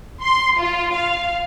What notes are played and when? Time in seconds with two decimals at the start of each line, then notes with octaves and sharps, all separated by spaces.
0.21 C6
0.57 F4
0.92 F5